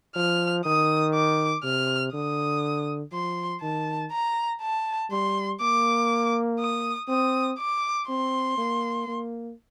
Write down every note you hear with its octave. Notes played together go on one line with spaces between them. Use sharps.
F3 F6
D#3 D#6
D6
C3 F6
D3 D#6
F3 C6
D#3 A5
A#5
A5
G3 C6
A#3 D6
D#6
C4 D#6
D6
C4 C6
A#3
A#3